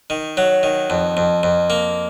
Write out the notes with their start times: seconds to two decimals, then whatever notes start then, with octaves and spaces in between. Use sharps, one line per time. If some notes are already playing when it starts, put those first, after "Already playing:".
0.10 D#3
0.37 F#3
0.63 D#3
0.90 F2
1.17 F2
1.43 F2
1.70 A#3